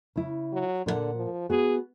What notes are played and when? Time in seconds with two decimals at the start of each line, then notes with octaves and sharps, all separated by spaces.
0.16 C#3 E4
0.53 F#3
0.86 A#2 D3 A#4 F#5
1.15 F3
1.50 B3 F#4 G#4